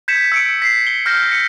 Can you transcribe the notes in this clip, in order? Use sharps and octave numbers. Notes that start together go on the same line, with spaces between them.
G6 G#6 B6 C#7 E7
E6 C#7 D7
B6 C7
G7
F6 G6 A#6
C#7